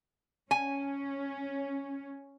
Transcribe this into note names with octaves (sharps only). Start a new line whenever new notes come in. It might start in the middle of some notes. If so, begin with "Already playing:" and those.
C#4 G#5